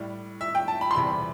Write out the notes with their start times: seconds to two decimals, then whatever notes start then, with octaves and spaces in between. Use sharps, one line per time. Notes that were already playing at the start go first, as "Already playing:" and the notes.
Already playing: A2 G3
0.41 E5
0.55 G5
0.68 A5
0.81 B5
0.91 C6
0.95 E2 C3 E3 G3 B5